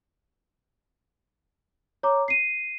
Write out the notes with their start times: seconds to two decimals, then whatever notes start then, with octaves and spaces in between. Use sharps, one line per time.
2.03 C#5 A#5 D6
2.28 C7 D#7